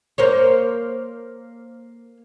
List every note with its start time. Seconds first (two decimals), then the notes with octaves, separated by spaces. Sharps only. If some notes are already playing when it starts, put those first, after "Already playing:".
0.18 A#3 C5 C#5